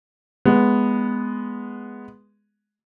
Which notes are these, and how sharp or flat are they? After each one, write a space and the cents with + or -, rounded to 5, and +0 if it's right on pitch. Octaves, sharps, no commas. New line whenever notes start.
G#3 +0 B3 +0